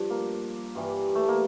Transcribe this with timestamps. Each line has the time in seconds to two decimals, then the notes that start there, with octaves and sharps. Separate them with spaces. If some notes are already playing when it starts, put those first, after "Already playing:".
Already playing: G2 F3 D4
0.10 A#3
0.75 G2 E3 G3
1.15 A3
1.28 A#3